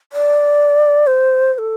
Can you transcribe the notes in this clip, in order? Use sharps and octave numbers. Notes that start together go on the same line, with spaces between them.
D5
C5
C5
A4